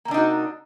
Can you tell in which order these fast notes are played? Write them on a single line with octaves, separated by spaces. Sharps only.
A#3 C3 D4 D#4 F#4